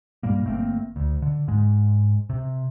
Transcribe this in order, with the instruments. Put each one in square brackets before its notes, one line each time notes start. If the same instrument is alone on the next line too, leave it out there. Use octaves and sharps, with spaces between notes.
[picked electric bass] G2 A#2 G3 A#3
G1 A3 A#3 C4
D2
D3
G#2 G#3
C3